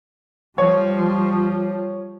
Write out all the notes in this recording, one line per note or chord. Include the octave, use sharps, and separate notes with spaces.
F3 G3 C#5